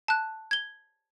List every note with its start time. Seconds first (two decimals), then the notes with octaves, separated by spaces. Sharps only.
0.08 A5 F#6
0.51 G#6 G7